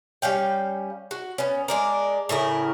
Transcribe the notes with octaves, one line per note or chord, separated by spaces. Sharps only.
G3 C#4 F5 G5
F#4
B3 C#4
G#3 D4 A#4
A2 C#3 E4 A#4